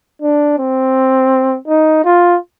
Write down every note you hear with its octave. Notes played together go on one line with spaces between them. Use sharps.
D4
C4
D#4
F4